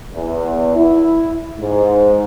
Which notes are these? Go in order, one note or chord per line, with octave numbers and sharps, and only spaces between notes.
E2
E4
G#2